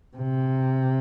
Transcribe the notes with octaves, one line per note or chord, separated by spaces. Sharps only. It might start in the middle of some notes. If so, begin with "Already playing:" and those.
C3